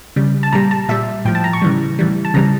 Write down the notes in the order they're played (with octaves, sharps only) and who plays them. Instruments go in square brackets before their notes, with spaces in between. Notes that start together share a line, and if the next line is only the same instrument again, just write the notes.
[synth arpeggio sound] C#3 G3
A5
A#2 G3 A#5
A5
A#2 G3 E5
A2 F3 G5
A5
A#5
C#6
C#3 E3 G3
A2 E3 G3
A5
C#3 E3 G3 A#5